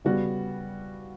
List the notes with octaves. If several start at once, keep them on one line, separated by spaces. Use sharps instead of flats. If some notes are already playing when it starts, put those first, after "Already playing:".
C#3 G3 B3 F#4